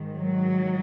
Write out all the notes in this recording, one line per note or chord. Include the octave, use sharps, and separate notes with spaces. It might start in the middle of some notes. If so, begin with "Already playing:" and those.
Already playing: G#2 D#3
F#3